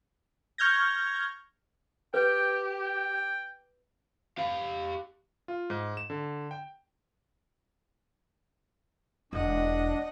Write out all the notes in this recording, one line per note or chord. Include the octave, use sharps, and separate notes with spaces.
C#6 F6 G6 G#6 A#6
G4 B4 G5
G5
G4 F5
F4
G#2
E7
D3
G5
E1 D4 D#5 F#5